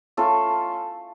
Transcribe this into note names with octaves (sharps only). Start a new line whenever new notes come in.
A3 C#4 F4 A4